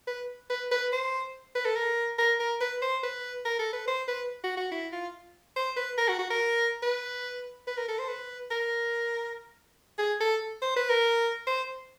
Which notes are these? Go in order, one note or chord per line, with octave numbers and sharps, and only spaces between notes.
B4
B4
B4
C5
B4
A4
A#4
A#4
A#4
B4
C5
B4
A#4
A4
B4
C5
B4
F#4
F#4
E4
F4
C5
B4
A#4
F#4
F#4
A#4
B4
B4
A#4
A4
C5
B4
A#4
G#4
A4
C5
B4
A#4
C5